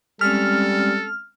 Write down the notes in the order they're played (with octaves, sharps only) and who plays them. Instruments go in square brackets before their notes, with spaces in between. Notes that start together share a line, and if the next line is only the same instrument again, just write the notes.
[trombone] G3 [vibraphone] G#3 C4 C#4 [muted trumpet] A4 [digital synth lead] F6